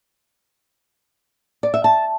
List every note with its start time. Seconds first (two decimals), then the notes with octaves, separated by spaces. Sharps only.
1.63 D5
1.74 E5
1.84 A5